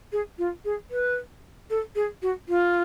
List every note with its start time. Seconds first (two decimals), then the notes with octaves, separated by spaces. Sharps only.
0.12 G#4
0.38 F4
0.65 G#4
0.91 B4
1.70 A4
1.96 G#4
2.22 F#4
2.49 F4